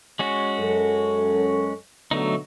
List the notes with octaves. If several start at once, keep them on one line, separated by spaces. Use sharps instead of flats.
G#3 C#4 F#4
F#2 A4
B2 D3 F#3 A3 D#4